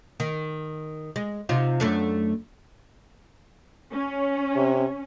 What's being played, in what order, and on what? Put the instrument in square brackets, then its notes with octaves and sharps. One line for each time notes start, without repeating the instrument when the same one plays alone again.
[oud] D#3
G#3
C3 D#4 F4
F#2 A3 D4
[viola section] C#4
[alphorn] C3